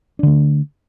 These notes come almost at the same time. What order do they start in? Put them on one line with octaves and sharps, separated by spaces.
D4 D3 A3